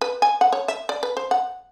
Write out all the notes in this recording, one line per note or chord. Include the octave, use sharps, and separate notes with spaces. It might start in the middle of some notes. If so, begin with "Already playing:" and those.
B4
G#5
F#5
C#5
E5
D5
B4
C5
F#5